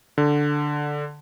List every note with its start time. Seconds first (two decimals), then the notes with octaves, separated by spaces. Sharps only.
0.18 D3